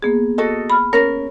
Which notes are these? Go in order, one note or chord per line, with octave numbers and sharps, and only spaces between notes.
A#3 B3 G#4
F#4 A4 D#5
B5 F6
C#4 A#4 C#5 A#6